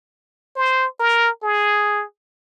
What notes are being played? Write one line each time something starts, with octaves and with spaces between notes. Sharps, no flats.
C5
A#4
G#4